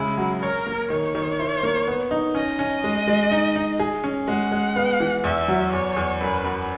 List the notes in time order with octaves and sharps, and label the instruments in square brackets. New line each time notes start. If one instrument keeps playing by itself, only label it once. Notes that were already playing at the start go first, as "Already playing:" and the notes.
Already playing: [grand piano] C#3 G#3 [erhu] E4
[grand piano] F#3
[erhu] A#4 [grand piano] C#5
[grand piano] A#3
[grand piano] D#3 [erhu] C#5
[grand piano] D#3
E4
A#3
B3
D#4
[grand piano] C#4 [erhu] D#5
[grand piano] C#4
G#3
G#3
D#4
D#4
G#4
C#4
[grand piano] G#3 [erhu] F#5
[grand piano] G#3
B3
E3
[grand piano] E2 [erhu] E5
[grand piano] F#3
[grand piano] E2 [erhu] C#5
[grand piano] E2
[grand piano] F#2 [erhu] B4
[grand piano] F#2